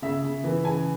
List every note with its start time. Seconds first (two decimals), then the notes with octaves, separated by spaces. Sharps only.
0.02 C#3 E5
0.23 C#3
0.44 E3
0.64 C#3 G#5